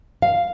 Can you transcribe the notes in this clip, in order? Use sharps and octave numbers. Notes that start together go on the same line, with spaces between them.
F5